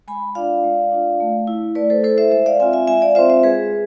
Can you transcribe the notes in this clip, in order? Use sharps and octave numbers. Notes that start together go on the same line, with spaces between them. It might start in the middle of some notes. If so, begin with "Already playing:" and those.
G#3 G#5 B5
D4 F4 D5 F5
G#3
D4 F4
A3
E4
A3 B4 D5
A4 C5
E4 A4 C5
C5 E5
G#3 C5 E5
D5 F5
C4 F4 E5 G#5
E5 G#5
G#3 E5 G#5
D5 F5
C4 F4 C5 E5
C5 E5
G#3 G#4 B4